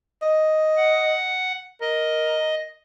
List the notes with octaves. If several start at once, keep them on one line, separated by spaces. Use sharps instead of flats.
D#5
F#5
A#4 D#5